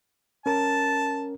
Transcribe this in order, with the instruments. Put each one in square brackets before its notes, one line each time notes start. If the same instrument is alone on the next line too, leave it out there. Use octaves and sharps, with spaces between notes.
[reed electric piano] C#4 A#4 [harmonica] A5